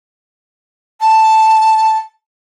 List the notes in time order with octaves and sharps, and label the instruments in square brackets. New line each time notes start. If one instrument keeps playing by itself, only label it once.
[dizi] A5